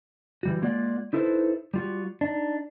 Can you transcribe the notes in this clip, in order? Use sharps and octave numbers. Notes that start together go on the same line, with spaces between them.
E3 G3 F#4
G#3 A#3 F4 D5 F#5
D#4 E4 A4 B4 C5
G3 F4 F#4
D4 D#4